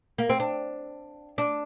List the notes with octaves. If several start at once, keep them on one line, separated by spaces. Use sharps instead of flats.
A#3
C4
D4
D4